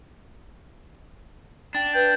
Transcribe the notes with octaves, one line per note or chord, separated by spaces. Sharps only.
D4 G5
B4 G5